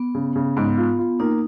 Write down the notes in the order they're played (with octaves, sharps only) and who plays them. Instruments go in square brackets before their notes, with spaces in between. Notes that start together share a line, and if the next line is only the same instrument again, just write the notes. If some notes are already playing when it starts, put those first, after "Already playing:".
Already playing: [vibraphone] B3
[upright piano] C#3
C#3
[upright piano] G#2 [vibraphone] B3
[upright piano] F4
F4
[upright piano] A#3 [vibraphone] D#4